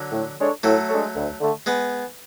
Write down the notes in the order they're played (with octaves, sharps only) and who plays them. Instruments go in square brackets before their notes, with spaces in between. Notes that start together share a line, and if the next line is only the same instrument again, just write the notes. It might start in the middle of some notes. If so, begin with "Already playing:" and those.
Already playing: [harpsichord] D3 F#3
[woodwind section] A2
G#3 D4 A4 C#5
[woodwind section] A2 [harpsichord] F#3 A3
[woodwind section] G#3 D4 A4 C#5
D2
D3 A3
[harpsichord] G#3 B3